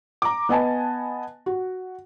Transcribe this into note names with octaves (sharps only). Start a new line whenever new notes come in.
A#5 D6
B3 D#5 G#5 A5
F#4